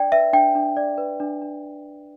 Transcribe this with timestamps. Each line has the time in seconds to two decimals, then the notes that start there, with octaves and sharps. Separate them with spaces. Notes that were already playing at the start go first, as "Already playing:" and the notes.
Already playing: D4 D5 G5
0.12 B4 E5
0.33 D4 G5
0.55 D4
0.77 D5
0.98 B4
1.20 D4
1.42 D4